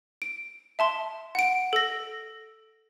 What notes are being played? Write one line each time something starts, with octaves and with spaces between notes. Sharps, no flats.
D7
E5 A5 C6
F#5 D7
A4 A#6